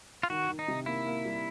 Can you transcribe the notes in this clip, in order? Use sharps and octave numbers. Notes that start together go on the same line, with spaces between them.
F4
D#3 F#4
D#3
D#4
C3
A#3 E4
A#3
G3